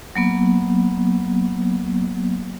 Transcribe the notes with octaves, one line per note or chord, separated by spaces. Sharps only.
F#3 A#3 B3